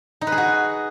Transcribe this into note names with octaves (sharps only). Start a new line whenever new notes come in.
D#4
B4
G#4
F#4